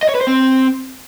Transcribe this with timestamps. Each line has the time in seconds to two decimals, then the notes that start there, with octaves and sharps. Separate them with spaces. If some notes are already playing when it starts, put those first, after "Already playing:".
0.03 D#5
0.09 C#5
0.15 B4
0.21 C5
0.27 C4